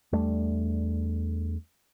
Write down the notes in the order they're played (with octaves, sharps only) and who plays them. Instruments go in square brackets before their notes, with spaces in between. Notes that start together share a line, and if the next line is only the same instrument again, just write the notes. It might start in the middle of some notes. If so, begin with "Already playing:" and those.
[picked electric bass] E2 G3 A3 D4